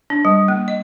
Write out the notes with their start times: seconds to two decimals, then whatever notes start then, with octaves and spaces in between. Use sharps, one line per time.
0.10 D4
0.25 G3
0.48 A#3
0.68 D#5